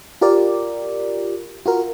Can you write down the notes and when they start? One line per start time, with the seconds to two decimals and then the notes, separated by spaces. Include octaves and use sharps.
0.21 F4 G4 A#4 D5
1.66 F4 F#4 A#4